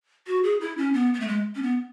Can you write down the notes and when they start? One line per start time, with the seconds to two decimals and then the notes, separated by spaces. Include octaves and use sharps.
0.27 F#4
0.44 G#4
0.61 E4
0.78 C#4
0.93 B3
1.14 B3
1.20 A3
1.27 G#3
1.55 C#4
1.62 B3